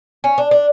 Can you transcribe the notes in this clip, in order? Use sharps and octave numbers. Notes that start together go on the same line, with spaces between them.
C#4
D4
D4